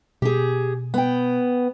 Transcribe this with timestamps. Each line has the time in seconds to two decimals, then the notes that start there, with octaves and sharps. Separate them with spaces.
0.22 B2 G4 G#4
0.94 B3 G5